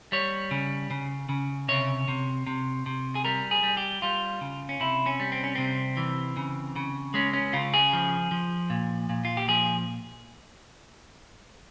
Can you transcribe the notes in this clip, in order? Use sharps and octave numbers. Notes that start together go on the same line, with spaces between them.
G3 C#5
C#3
C#3
C#3
C3 C#5
C3
C3
C3
G#4
G3 A#4
G#4
G3
G4
G3 F4
C#3
C#4
C3 E4
C#4
G3
C4
C#4
C3 C4
E3
C#3
C#3
G#3 C#4
C#4
C#3 F4
G#4
F3
F3
A#2
A#2
F4
G4
F3 G#4